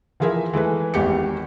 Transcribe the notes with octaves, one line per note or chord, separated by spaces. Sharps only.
E3 F3 G#4 A#4 E5
E3 G#3 A3 B4
G#1 E2 G4 C#7